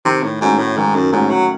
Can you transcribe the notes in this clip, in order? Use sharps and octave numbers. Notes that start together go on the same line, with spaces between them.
C3 D#3
A2
G#2 A3 C#4 F#4
A2
G#2 D#3
F#2
G#2 A3 C#4 F#4
F#3